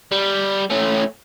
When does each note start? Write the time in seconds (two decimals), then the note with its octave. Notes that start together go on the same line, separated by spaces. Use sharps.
0.12 G3
0.70 A3 C#4